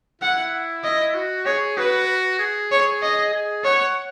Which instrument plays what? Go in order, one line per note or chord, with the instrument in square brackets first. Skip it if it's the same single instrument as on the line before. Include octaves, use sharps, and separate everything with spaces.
[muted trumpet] E4 [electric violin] F#5
[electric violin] D#5
[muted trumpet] F#4
[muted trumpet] G#4 [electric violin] C#5
[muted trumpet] F#4 [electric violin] B4
[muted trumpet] G#4
[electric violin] C#5
D#5
[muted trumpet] G#4
[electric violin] C#5 [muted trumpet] F#5